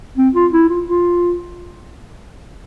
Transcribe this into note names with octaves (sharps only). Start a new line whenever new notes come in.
C4
F4
E4
F4
F4